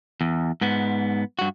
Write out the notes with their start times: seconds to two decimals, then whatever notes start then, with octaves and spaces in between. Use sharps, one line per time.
0.21 E2
0.61 G#2 B3
1.39 G2 F#4